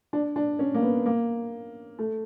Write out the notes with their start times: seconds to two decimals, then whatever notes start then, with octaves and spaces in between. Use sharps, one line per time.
0.13 D4
0.36 D4
0.59 C#4
0.74 A#3
0.82 B3
1.06 A#3
1.99 A3